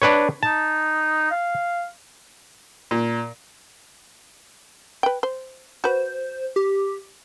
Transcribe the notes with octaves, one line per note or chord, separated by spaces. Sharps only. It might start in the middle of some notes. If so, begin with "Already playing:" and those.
D4 B4 C#5
D#4 A5
F5
A#2
B4 G5
C5
F#4 B4 C5
G4